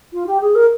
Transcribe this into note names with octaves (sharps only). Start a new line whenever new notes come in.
F4
G4
G#4
A#4